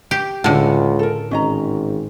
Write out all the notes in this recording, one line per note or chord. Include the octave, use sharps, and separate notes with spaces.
G4
C#2 A2 D3 F#5
A4 A#4
G#1 C#4 D#5 A#5